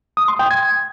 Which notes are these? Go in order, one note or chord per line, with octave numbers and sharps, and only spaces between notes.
D#6
C6
G5
G#6